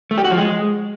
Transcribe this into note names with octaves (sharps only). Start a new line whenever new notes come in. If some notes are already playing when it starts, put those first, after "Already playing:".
A3
G4
F#4
F3
G#3